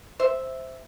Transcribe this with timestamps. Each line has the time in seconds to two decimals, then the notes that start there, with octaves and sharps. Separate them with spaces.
0.19 C5 E5